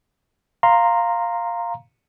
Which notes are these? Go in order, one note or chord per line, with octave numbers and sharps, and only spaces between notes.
F5 A#5 C6